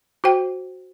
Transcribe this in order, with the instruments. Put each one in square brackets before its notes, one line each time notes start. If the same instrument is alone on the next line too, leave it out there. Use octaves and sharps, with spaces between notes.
[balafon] F#4 C5 G5